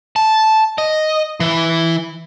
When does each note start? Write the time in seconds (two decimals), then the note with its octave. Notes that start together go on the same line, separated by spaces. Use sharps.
0.16 A5
0.78 D#5
1.40 E3